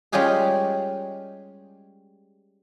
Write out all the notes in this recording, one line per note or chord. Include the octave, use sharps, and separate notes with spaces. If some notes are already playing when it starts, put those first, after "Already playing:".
G3 G#3 C#4 F4 G4 G#4